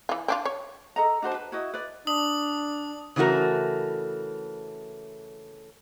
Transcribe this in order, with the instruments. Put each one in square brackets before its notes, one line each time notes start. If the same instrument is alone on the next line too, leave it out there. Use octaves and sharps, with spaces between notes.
[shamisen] E3 F4
C4 D4 F4
C#5
[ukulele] A4 D#5 A#5
D4 F#4 C5 A5
B4
E4 F#4 D#5
B4 D5
[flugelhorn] D4 [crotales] D#6 F#7
[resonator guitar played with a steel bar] C#3 E3 A3 F#4 A#4